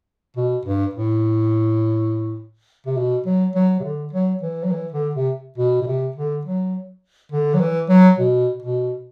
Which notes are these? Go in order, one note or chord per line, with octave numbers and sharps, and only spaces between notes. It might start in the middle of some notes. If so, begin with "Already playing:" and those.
B2
G2
A2
C3
B2
F#3
F#3
C3
D3
F#3
E3
F#3
E3
D3
C3
B2
B2
C3
D3
F#3
D3
F#3
E3
F#3
B2
B2